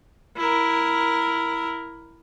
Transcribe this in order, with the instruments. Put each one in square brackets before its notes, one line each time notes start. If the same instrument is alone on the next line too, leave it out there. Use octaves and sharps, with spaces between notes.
[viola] E4 A#4